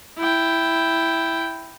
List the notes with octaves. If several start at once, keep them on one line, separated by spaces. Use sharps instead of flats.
E4 G5